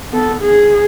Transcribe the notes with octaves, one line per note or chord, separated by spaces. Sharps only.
B3 A4
G#4